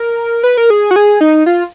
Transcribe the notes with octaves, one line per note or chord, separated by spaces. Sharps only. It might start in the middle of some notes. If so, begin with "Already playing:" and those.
Already playing: A#4
B4
A#4
G#4
F#4
G#4
D#4
F4